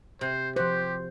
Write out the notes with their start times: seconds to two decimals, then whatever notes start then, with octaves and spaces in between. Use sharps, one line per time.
0.21 C3 C5
0.56 F3 F#4 G4 C5